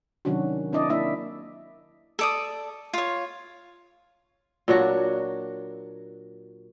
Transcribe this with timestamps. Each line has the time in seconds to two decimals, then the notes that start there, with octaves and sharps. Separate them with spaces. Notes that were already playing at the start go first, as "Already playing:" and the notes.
0.25 C3 D#3 F#3 C#4 D4 F#4
0.72 C4 D4 E4 D5 D#5
0.89 A#3 D4 E4 D5 E5
2.19 A4 D5 D#6
2.93 F4 C#5
4.68 A#2 F#3 D4 F#4